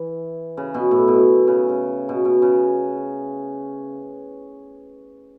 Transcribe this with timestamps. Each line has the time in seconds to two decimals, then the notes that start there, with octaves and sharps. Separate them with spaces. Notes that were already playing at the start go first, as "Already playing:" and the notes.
Already playing: E3
0.57 C#3
0.74 B2
0.91 A2
1.08 B2
1.47 C#3
1.69 C#3
2.09 B2
2.25 B2
2.42 C#3